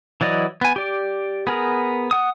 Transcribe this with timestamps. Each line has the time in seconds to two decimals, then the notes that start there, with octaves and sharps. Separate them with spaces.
0.21 E3 F#3 D5 D#5
0.61 B3 G#5
0.76 G4 D5
1.47 B3 G#4 A#4
2.11 F#5 D#6